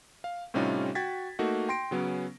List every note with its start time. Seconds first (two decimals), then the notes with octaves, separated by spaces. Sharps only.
0.24 F5
0.54 A2 C3 G3 C#4 D#4 F4
0.95 F#4 G5 G#6 A6 B6
1.39 A3 A#3 D#4 F#4
1.69 G5 C6 A#6 D7
1.91 C#3 F#3 B3 C#4